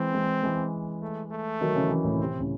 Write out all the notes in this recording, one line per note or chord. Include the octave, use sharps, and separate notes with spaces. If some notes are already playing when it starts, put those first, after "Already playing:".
Already playing: E3 G#3 C4
E3 G#3
E3 G#3
A3
A3
D#3 F#3
C#3 E3
C#3 E3
A2
C#3
C3 C4
A2 C#3